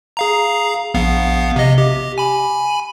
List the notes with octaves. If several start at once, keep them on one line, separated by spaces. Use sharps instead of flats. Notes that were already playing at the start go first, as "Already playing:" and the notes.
G#4 F5 A#5
A#1 B3 F5
C3 D#5
G4
G#5 B5